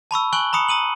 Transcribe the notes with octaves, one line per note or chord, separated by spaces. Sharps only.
A5 B5 C#6 E6
G#5 C#6 F#6 F#7 G7
A#5 B5 D#6 C#7
A#5 D#6 D#7 F#7